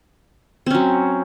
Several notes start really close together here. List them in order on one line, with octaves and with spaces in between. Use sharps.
C4 C#4 F#3